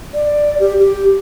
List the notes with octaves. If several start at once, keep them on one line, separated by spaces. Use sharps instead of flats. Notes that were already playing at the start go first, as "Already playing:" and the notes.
D5
G4
G4